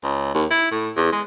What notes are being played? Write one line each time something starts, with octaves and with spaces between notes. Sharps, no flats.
C#2
D#2
E4
A2
E2
G#3